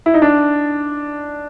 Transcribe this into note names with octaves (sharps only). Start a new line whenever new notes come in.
E4
D#4
D4